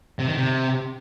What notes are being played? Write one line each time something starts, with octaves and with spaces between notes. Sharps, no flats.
C3
D#3
C3